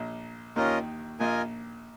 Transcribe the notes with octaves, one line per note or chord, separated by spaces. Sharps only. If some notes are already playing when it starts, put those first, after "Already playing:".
Already playing: A#1 A#2
D#2 D#3 C#4 F4 A#4 D#5
A#1 A#2 F4 A#4 D#5 G#5